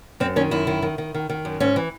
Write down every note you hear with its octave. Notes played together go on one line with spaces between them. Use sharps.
F#2 C4
D#3 C#4
F#2 E4
D#3
D#3
D#3
D#3
D#3
F#2
G#2 C#4
E3